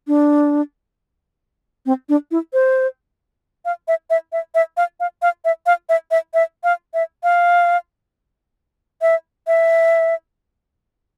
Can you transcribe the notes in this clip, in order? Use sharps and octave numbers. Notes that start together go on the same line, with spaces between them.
D4
C4
D4
E4
C5
F5
E5
E5
E5
E5
F5
F5
F5
E5
F5
E5
E5
E5
F5
E5
F5
E5
E5